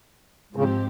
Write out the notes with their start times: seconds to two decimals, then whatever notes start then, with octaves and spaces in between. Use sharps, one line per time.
0.56 G#2 C#3 F3 C4 G4